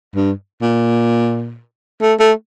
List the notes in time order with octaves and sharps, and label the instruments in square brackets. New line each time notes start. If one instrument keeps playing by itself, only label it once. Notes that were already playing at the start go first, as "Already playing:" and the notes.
[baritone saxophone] G2
A#2
A3
A3